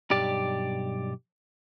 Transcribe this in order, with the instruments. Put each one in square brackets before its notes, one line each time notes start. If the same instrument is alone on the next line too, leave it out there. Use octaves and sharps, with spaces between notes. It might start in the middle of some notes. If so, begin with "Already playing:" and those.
[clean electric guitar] B1 G2 G4 D5